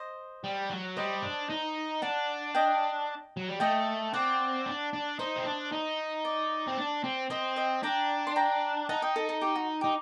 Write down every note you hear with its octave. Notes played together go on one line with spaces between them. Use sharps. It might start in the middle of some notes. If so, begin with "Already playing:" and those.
Already playing: C5 D#5
G3
F#3
G3 C5 D#5
D4
D#4
D4 F#5 A5
D#5 G5
F#3
G3
A3 D#5 G5
C4 D5 F#5
D4
D4
D#4 C5 D#5
C4
D4
D#4
D5
C4
D4
C4
C4 C5 D#5
D#5 G5
D4 G5 A#5
C6
G5 A#5
D#4 F#5 A5
D#5 G5
A4
A4
G4
F#4
D#4 G4